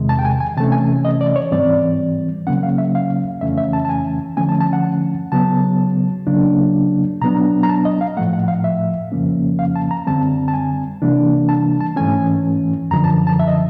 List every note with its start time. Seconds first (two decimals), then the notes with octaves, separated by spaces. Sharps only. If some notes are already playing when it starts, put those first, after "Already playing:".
Already playing: E2 C3 D#3 G#3
0.09 A5
0.19 G5
0.25 G#5
0.40 G#5
0.57 C3 E3 A3 C#4 A5
0.72 G#5
1.05 D#5
1.21 D5
1.36 C#5
1.51 G#2 E3 G3 C4 D5
2.47 C#3 F#3 A#3 C#4 F#5
2.63 F5
2.78 E5
2.95 F5
3.41 F2 C#3 E3 A3 C#4 E5
3.58 E5
3.73 A5
3.85 A5
3.89 G#5
4.37 D3 F3 A3 C#4 G#5
4.49 A5
4.61 A5
4.73 F#5
5.32 C#3 F#3 B3 A5
6.27 C#3 F#3 A#3 D4
7.21 B2 F#3 B3 D4 A#5
7.63 A#5
7.69 A5
7.85 D#5
8.01 F5
8.17 A2 F3 A3 F#5
8.33 F#5
8.48 F5
8.64 E5
9.12 F2 C#3 F3 A#3 C#4
9.59 F5
9.76 A5
9.91 A#5
10.07 F#2 D3 G3 C4 A5
10.48 A5
10.54 G#5
11.02 C3 E3 G3 A#3 D4
11.49 A5
11.81 A5
11.96 G#2 E3 A3 C#4 G#5
12.91 F#2 D3 F3 A#5
13.04 A5
13.27 A5
13.39 E5
13.48 D#5